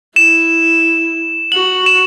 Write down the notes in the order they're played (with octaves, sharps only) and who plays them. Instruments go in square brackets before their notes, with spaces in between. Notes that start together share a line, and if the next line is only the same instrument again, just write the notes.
[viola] E4 [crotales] E7
[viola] F#4 [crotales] F#7
[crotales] E7